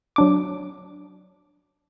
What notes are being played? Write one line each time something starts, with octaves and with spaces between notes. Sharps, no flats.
F#3 D4 D6